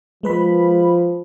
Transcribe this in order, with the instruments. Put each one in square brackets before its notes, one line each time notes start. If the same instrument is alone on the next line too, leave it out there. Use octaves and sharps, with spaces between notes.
[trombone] F3 [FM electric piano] G#3 B4 B5